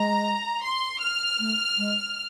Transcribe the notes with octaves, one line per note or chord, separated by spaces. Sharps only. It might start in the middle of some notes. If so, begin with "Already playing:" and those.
Already playing: G#3 A#5
C6
F6
A3
G#3